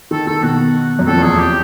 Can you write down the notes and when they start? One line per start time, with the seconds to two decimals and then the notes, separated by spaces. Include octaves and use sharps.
0.11 D#3 A4
0.27 D#3 A4
0.43 B2 F#4
0.99 F#2
1.07 F2 A4
1.17 E2
1.22 G#4
1.28 F2
1.38 G4